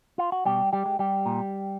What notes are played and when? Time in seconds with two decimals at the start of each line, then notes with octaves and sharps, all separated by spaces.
0.18 F4
0.32 F#4
0.45 B2 G3 G4
0.73 G3 G4
0.86 G#3
0.99 G3 G4
1.26 A#2